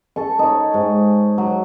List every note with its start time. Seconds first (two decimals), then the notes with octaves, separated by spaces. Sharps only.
0.16 A4 C#6
0.39 D#4 C#5
0.74 G#2
1.38 F#3